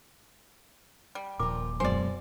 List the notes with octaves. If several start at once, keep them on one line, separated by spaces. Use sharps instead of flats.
G3
D#1 A#2 F3 A#4 D6
F#2 B2 G#3 C5 D5 G#5